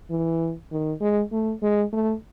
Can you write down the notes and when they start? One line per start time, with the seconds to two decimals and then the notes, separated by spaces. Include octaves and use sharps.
0.10 E3
0.71 D#3
1.01 G#3
1.32 A3
1.62 G#3
1.93 A3